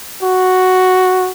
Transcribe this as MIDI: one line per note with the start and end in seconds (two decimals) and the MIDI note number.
0.23 1.31 66